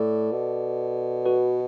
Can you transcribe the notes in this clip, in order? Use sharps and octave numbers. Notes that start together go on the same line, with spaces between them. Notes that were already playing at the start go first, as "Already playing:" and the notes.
Already playing: A2 A4 D5
B2
F#4 B4